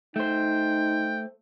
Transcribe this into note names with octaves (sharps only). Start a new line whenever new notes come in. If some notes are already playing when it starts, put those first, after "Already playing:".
A3 D#4 C5 G5